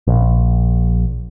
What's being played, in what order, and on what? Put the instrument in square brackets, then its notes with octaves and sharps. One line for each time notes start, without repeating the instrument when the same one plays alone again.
[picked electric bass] A#1